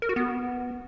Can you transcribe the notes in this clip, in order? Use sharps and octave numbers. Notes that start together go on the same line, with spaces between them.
A#4
F#4
B3